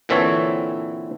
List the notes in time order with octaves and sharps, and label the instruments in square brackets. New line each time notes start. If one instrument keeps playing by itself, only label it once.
[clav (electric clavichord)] A#2 D3 E3 C4 A4 C#5